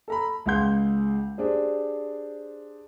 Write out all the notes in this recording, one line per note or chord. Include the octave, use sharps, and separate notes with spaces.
A4 A#5 B5
C#2 G#3 F5 F#5 C6 G6
D4 G4 G#4 C5